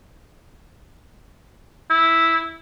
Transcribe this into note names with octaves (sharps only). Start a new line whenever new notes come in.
E4